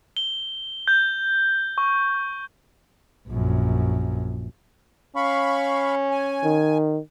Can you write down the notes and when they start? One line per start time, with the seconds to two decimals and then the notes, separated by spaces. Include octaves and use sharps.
0.17 G7
0.88 G6
1.78 C#6
3.28 A#1 F#2
5.16 C#4 F5 B5 C#6
6.11 G#5
6.44 D#3